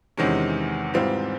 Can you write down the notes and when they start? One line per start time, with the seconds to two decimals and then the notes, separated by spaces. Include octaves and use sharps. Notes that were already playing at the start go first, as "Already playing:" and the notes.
0.17 E2 C3 D#3 G#3 C#4
0.94 G#2 E3 G3 C4 F4